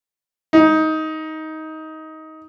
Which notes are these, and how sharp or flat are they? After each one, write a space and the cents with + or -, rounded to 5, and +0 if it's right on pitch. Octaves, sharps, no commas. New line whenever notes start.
D#4 +15